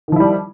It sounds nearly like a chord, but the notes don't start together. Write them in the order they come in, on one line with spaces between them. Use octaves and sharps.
D#3 F3 E4 G3